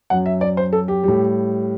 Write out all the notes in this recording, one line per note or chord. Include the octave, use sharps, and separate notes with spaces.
F#2 F#3 F#5
E5
D5
C5
A4
G4
A2 G3